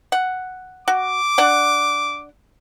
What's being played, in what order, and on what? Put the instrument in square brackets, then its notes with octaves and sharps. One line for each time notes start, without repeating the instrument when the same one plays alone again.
[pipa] F#5
[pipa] F#4 [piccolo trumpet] D6
[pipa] D4 D5 F#5